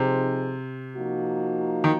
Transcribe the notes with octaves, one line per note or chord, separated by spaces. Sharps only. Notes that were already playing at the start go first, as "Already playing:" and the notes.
Already playing: C3 F3 C4 D#4 G#4 C5
F3 A#3 D#4 F#4
D#3